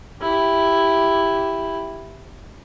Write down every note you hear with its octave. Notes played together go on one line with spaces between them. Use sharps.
E4 G4